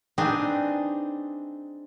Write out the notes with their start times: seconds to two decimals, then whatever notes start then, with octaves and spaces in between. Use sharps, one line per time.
0.18 C4 D4 D#4 G#4 B4